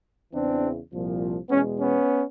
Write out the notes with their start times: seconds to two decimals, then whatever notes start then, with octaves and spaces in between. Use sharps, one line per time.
0.32 E2 C#3 E3 C4 D4
0.91 C2 A#2 F3
1.49 E2 B2 G#3 B3 C#4
1.79 B3 C#4